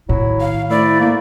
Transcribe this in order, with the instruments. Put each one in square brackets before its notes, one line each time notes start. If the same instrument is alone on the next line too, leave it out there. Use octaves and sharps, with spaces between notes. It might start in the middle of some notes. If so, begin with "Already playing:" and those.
[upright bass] A2 D#3 [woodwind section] F#3 E4
[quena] F5
[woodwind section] D2 A3 [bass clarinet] E4 [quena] D5
[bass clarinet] A#3